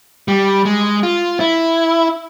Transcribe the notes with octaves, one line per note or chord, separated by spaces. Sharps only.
G3
G#3
F4
E4